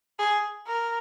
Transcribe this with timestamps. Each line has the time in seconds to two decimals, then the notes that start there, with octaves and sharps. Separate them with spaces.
0.19 G#4
0.67 A#4